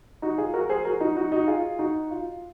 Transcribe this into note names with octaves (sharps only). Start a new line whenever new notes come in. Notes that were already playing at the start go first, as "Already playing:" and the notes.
D#4 F#4
F4 G#4
F#4 A#4
G#4 C5
F#4 A#4
D#4 F#4
D#4 F#4
D#4 F#4
F4 G#4
D#4 F#4
F4